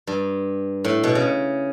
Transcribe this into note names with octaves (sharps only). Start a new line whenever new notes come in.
G2
A2
B2
C#3